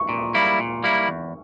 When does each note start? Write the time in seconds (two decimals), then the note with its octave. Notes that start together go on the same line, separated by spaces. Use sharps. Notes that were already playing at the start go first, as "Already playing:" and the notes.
Already playing: C#6
0.09 A#2
0.34 G3 A#3 E4
0.59 A#2
0.84 G3 A#3 E4
1.08 E2